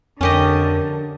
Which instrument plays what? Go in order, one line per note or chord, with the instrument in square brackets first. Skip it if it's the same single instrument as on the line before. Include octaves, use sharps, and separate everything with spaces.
[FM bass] F2 [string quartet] D3 [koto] C#4 G4 D#5 [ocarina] A#4